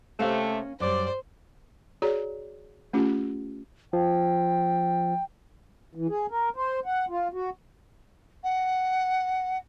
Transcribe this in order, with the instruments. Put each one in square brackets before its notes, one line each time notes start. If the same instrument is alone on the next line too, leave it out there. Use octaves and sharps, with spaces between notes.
[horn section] C3 A3 [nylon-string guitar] A#3 C#4 F5
[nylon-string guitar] F#2 G3 [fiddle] C5 [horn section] D5
[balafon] F#4 G#4 C#5 D5 A#5
A3 C#4 F4 G4
[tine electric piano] F3 [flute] G5
[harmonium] E3
G#4
A#4
C5
F#5
F4
F#4
[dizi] F#5